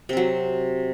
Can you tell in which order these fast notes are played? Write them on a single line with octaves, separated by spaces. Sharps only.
C3 C4 F#3